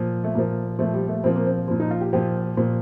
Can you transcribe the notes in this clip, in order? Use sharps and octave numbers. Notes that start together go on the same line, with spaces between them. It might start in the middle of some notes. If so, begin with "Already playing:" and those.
Already playing: A#2 F3
A3
A#2 F3 A#3
A#2 F3 A3
G3
A3
A#2 F3 C4
A#3
C4
A#2 F3
D#4
F4
G4
A#2 F3 G4
A#2 F3